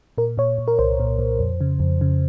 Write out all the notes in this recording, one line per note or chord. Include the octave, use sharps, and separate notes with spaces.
A#2 A#4
A#2 C#5
A#2
A#4
C2 C5
A#2
A#2
F2
C#3
F2
C#3